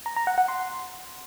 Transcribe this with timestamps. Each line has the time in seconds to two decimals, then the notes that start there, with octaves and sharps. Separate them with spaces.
0.06 A#5
0.16 A#5
0.27 F#5
0.38 F#5
0.48 C6